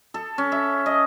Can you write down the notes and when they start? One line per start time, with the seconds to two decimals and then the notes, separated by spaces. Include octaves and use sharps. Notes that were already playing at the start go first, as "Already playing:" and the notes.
0.14 A4
0.38 C#4
0.52 E5
0.86 D#5